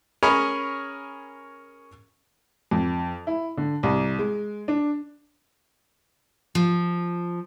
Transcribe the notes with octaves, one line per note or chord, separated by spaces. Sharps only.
C#4 G#4 A#4 C#5 B5
F2
E4
D3
C2
G#3
D4
F3